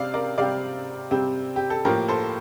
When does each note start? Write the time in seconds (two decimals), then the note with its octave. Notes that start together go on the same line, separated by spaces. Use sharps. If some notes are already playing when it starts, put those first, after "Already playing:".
Already playing: C3 G3 C4 D5 F5
0.14 A#4 D5
0.38 C3 G3 C4 D5 F5
1.11 C3 G3 C4
1.56 G4
1.70 A4
1.85 A2 F3 A#3 G4 A#4
2.08 A4 C5